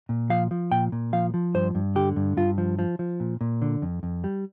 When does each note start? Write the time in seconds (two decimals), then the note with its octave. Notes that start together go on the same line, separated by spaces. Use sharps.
0.09 A#2
0.30 F3 F5
0.51 F3
0.71 A#2 G5
0.92 A#2
1.13 F3 F5
1.34 F3
1.54 G2 C5
1.75 G2
1.95 D3 G4
2.16 G2
2.37 G2 F4
2.58 F3
2.79 F3
2.99 F3
3.20 A#2
3.41 A#2
3.62 D3
3.82 F2
4.03 F2
4.24 G3